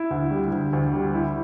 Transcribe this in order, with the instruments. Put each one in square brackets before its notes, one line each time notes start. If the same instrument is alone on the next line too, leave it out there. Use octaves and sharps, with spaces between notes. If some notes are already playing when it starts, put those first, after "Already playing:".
Already playing: [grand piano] E4
D2
G3
D2
D2
G3
E4